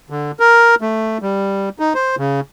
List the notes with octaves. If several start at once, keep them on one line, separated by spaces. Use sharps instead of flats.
D3
A#4
A3
G3
D#4
C5
C#3